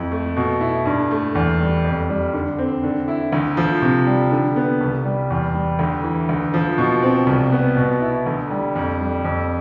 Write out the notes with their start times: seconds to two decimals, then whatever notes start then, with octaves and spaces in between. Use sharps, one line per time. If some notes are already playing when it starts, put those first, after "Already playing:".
Already playing: F2 E4
0.11 A3
0.36 B2
0.61 E4
0.85 G2
1.11 A3
1.35 E2
1.60 G3
1.85 F2
2.09 G3
2.33 D3
2.58 C4
2.84 D3
3.08 E4
3.32 D2
3.57 F3
3.82 C3
4.07 G3
4.31 D3
4.56 B3
4.81 C2
5.05 G3
5.30 E2
5.54 G3
5.79 D2
6.04 E3
6.29 D2
6.54 F3
6.78 B2
7.03 C4
7.27 C2
7.52 B3
7.76 B2
8.01 E4
8.26 D2
8.51 G3
8.76 F2
9.00 G3
9.25 F2